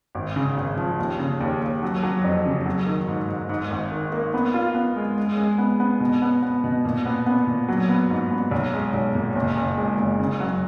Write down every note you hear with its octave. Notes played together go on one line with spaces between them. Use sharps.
G#1
C#3
G#1
F3
D#2
C#3
D#2
D#2
F#3
F#3
F2
C#3
F#3
D#3
G#2
G#2
G#2
G#1
D#3
A#3
B3
F4
B3
G#3
G#3
G#3
B3
B3
B2
B3
B3
B2
A#2
B3
B3
A#2
F#3
B3
G#2
B3
B1
G#3
B1
A#2
F#1
F#1
G#3
F#1
C#3
F#3